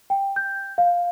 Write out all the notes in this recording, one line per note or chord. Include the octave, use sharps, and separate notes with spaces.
G5
G6
F5